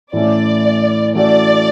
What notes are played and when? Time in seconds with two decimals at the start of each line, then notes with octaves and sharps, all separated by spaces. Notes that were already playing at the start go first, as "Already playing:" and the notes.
0.13 A2 E3 A3 C#4 E4 D5
1.15 E3 A3 C#4 F#4 D5